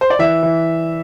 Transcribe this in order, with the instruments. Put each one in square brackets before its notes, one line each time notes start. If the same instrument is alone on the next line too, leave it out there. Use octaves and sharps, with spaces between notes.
[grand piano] C5
D5
E3 E5
E3